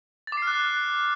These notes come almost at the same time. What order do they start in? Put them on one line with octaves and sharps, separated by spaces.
A6 D6 C7 F6 F#6